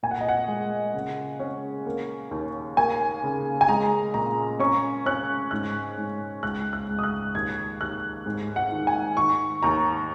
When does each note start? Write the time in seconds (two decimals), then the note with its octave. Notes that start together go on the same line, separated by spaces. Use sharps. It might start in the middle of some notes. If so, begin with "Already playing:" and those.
0.03 A#2 G#5
0.11 F#5
0.21 D#5
0.29 F#5
0.48 G#3
0.94 C#3
1.40 C#4
1.86 A#3
2.31 D#2
2.77 A#3 G#5
3.24 C#3
3.61 G#5
3.69 G#3 A#5
4.14 A#2 A#5
4.60 C#4 C#6
5.06 C#4 F#6
5.51 G#2 F#6
5.98 G#2
6.42 C#2 F#6
6.73 F#6
6.89 C#2
6.99 D#6
7.03 F#6
7.35 D#2 G#6
7.81 D#2 F#6
8.26 G#2
8.56 F#5
8.72 D#3
8.87 G#5
9.17 D#3 C#6
9.63 D#2 A#5